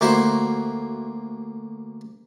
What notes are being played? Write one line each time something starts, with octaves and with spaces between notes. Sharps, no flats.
D2 A#3 E4 F#4 C5 C6